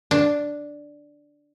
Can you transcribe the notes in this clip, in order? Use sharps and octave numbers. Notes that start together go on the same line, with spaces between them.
D4